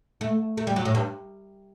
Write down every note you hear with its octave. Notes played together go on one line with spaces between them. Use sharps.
A3
A3
G3
F#3
A2
G2